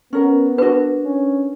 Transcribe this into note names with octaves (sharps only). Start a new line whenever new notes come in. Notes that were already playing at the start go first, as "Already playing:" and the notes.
B3 C#4 A#4 F#5
D4 F#4 A#4 B4
C#4